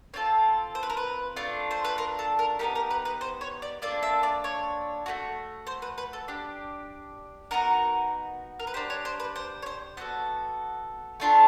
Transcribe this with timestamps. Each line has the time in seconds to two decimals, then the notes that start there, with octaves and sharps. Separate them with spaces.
0.14 C4 F4 A4 C#5
0.75 C5
0.83 B4
0.90 A#4
0.97 B4
1.36 A3 D4 F4
1.71 C5
1.85 B4
1.98 A#4
2.19 A4
2.39 A#4
2.59 B3 D#4 G4 A#4
2.75 A#4
2.90 B4
3.05 B4
3.21 C5
3.41 C#5
3.62 D5
3.82 A#3 D4 F4 A4 D5
4.03 E5
4.23 D5
4.44 C#5
5.06 A3 C#4 F#4
5.67 C5
5.82 B4
5.98 B4
6.13 A4
6.28 D4 G4
7.51 B3 D#4 F#4 A#4
8.59 A#4
8.67 B4
8.74 D4 G4 C5
8.90 C#5
9.05 C5
9.20 B4
9.36 C5
9.62 C#5
9.66 C5
9.97 B3 D4 F#4 A4 C5
11.20 A3 D4 F4 A4